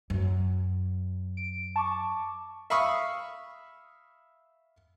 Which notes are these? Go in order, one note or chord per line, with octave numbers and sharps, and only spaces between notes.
F#2
D7
A5 C#6 D6
E5 F5 B5 C#6 D#6